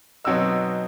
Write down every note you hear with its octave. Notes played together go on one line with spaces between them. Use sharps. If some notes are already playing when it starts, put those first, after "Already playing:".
B2 F#3 C4 D#4 E6